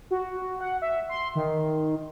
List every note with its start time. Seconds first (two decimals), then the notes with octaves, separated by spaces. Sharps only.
0.11 F#4
0.61 F#5
0.82 E5
1.09 C6
1.35 D#3